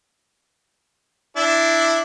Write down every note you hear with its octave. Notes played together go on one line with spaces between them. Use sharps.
D4 E4